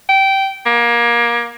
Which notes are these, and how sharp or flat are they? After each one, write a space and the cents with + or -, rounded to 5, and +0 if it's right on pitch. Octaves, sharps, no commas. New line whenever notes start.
G5 -15
A#3 +25